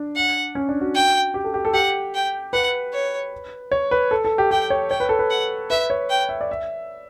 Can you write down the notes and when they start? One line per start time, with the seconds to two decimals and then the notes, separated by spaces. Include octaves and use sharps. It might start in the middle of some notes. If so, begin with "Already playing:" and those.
Already playing: D4
0.16 F#5
0.55 C#4
0.69 D4
0.81 F#4
0.95 G5
1.34 G4
1.44 A4
1.54 G4
1.65 A4
1.73 G4 F#5
2.14 G5
2.53 B4 F#5
2.93 C#5
3.72 C#5
3.91 B4
4.11 A4
4.25 A4
4.38 G4
4.51 G4 G5
4.70 C#5
4.90 C#5 G5
5.00 B4
5.09 A4
5.19 B4
5.30 F#5
5.70 B4 E5
5.90 C#5
6.10 G5
6.29 E5
6.41 D5
6.51 E5